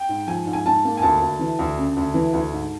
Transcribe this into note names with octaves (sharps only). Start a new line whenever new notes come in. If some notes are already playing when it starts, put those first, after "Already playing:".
Already playing: G5
G#2
F3 G#5
G#2
G#5
G#2 A5
A#3
G#5
D2 A5
D2
E3
D2
C#3
D2
E3
D2
G#2